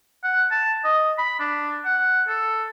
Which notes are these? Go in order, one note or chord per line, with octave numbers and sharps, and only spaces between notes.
F#5
A5
D#5
B5
D4
F#5
A4